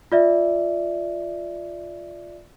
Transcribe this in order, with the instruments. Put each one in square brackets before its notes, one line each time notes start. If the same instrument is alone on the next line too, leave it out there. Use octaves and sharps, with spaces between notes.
[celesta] F4 D5 E5